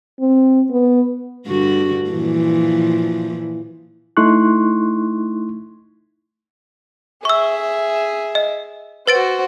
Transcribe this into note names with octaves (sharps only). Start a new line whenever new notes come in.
C4
B3
G2 D3 F#4
A#2 E3 F3
A3 D#4 E4 C6 C#6 F#6
G#4 E5 C#6 E6
D#5
F#4 B4 C5 A6 D7